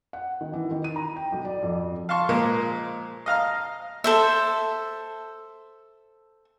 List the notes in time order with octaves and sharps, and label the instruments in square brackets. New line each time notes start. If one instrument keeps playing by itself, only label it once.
[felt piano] F#5
D#3
E3
D#3
D#7
A#5
G5
B1
D5
F2
[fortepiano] F5 A5 C6 C#6
A#2 F3 G#3 A#3
D#5 F5 A#5 F6
[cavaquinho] A4 C5 E5